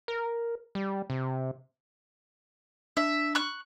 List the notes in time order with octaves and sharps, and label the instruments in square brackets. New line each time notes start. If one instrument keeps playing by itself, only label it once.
[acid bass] A#4
G3
C3
[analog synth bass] D4 [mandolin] E5
[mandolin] C#6 F#6